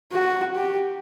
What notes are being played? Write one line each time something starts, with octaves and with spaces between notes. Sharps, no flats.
F#4
G4